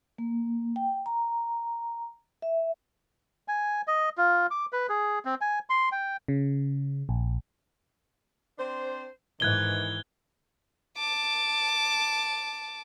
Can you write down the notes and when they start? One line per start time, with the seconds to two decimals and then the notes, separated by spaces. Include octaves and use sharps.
0.18 A#3
0.76 G5
1.06 A#5
2.42 E5
3.48 G#5
3.87 D#5
4.17 F4
4.51 D6
4.73 B4
4.89 G#4
5.25 C4
5.41 G#5
5.70 C6
5.92 G5
6.28 C#3
7.09 A#1
8.58 C4 D4 C5
9.40 G#2 D#3 E3 F#6 G#6 G7
10.98 A5 D6